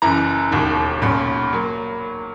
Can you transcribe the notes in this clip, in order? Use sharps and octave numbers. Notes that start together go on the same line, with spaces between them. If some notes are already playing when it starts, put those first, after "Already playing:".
F#1 F#2 E3 A#5
E1 D#2 D#3
B1 A#2 F#3 C#4 B5
F#3 A#3